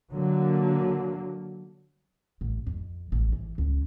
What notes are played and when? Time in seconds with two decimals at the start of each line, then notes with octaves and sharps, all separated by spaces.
0.12 D3 F#3 A#3
2.41 A1
2.67 F2
3.12 A1
3.32 E3
3.58 C#2